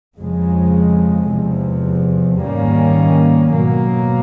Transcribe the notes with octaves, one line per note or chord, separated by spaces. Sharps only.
F2 C#3 F3 G#3
E2 C3 F3
G#2 D#3 G3 A#3 C#4
B2 F#3 A#3